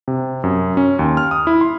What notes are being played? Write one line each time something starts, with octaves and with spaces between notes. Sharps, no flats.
C3
F#2
C#4
D#2
F6
D#6
E4
C6